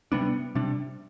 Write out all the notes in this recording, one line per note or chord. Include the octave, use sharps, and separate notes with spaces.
C3 G3 B3 D4
C3 G3 D4